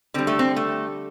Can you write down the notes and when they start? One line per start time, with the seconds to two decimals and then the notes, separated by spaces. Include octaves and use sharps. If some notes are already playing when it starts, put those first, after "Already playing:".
0.14 D3 G3 C4
0.27 A3
0.39 C4
0.56 A3